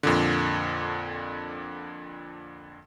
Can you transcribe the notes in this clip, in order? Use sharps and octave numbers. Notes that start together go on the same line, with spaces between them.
F2 A#2 D3